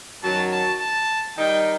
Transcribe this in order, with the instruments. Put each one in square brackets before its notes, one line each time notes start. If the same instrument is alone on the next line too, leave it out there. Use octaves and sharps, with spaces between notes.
[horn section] F#2 D#3 F#3 [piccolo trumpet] A5
[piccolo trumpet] A5
A5
[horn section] D#3 G3 D#4 [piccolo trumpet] G5